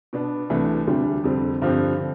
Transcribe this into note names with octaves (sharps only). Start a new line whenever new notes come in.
B2 B3 D4
C2 C3 E3 A3 D4
D2 C3 G3 D4 G4
F2 D3 G3 C4
G2 D3 F3 C4 G4
D3